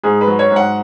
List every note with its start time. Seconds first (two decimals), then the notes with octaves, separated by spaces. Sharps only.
0.03 G#2 G#4
0.21 B4
0.27 F#3
0.39 C#5
0.51 G#2
0.56 F#5